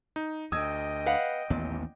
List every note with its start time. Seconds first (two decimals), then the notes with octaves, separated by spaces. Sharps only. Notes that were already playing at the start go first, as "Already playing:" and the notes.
0.16 D#4
0.52 D2 D#5 G5 D#6 E6 G#6
1.06 B4 F5 F#5
1.50 A1 D#2 A#2 B3